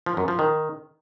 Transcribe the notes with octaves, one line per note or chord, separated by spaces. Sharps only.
F3
F#2
F3
D#3